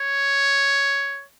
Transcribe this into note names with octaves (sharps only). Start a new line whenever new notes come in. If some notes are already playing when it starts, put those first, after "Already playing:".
Already playing: C#5